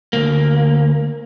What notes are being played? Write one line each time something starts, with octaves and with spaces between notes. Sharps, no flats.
D2 A#3